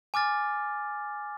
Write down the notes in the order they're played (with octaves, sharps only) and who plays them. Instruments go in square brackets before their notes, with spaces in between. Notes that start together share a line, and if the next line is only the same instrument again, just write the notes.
[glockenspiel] G#5 D6 F6 A6